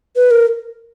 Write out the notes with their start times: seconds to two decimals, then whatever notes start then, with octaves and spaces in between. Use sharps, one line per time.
0.16 B4
0.31 A#4